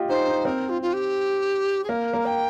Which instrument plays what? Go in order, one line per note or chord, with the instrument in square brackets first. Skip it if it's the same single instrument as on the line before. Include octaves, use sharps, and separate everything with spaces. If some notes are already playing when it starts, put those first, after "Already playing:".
Already playing: [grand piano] F4 G4 D#5
[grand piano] D#4 [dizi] C5
[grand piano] D#4
[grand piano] C4 [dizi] A#4
[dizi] F4
F4
G4
G#4
[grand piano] A#3 [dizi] A#4
[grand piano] A#3
[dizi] G5